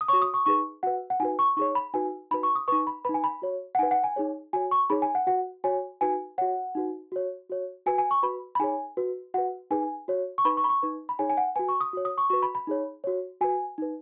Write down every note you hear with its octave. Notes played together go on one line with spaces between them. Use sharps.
D#6
F#4 C#5 C#6
D#6
C#6
D#4 G#4 B4 C#6
F#4 B4 F#5
F#5
D#4 F#4 B4 G#5
C#6
D#4 G#4 C#5 C#6
B5
D#4 F#4 B4 G#5
D#4 F#4 B4 B5
C#6
D#6
D#4 B4 C#6
B5
D#4 B4 B5
G#5
B5
F#4 C#5
F#5
D#4 B4 G#5
F#5
G#5
D#4 G#4 C#5
F#4 C#5 G#5
C#6
D#4 G#4 C#5 B5
G#5
F#5
F#4 B4 F#5
F#4 C#5 G#5
D#4 F#4 B4 G#5
F#4 C#5 F#5
D#4 F#4 B4
F#4 C#5
F#4 C#5
F#4 B4 G#5
G#5
C#6
F#4 B4 B5
B5
D#4 G#4 C#5 G#5
F#4 B4
F#4 B4 F#5
D#4 G#4 B4 G#5
F#4 C#5
C#6
D#4 B4 B5
C#6
B5
C#6
D#4 B4
B5
D#4 G#4 C#5 G#5
G#5
F#5
F#4 B4 G#5
C#6
D#6
F#4 C#5
D#6
C#6
F#4 B4 C#6
B5
B5
D#4 G#4 C#5
F#4 C#5
F#4 B4 G#5
D#4 B4